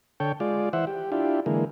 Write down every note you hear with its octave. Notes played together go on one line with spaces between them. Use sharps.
D3 A4 C#5 G5
G#3 F4 D5
E3 C5 E5 F#5
G4
D4 E4 F4 G4
D3 E3 G#3 A#3